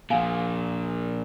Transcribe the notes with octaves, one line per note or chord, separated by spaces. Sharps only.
A#2 F3 F5 F#5 G#5